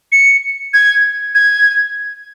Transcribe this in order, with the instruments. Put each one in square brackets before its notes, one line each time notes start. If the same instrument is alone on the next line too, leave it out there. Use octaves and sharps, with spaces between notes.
[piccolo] C#7
G#6
G#6